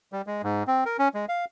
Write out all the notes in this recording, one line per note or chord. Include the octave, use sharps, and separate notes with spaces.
G3
G#3
G#2
C4
A#4
C#4
G#3
F5